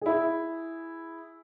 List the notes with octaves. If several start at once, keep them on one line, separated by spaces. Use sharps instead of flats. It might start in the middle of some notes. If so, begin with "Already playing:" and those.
E4 G#4